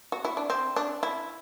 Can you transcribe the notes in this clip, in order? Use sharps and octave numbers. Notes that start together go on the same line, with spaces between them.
F#4
E4
D4
C4
D4
E4